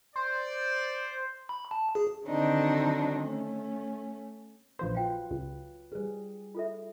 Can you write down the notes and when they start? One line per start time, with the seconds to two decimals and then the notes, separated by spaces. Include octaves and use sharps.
0.16 C5 D5
1.49 B5
1.71 A5
1.95 G#4
2.28 D3 D#3 F#3 C4 D4 D#4
3.21 A3 C#4
4.79 A#1 F3 B4 C5
4.95 F#3 F4 F5 G5
5.31 C#2
5.92 G3 G#4 B4 C5
6.55 F4 A4 E5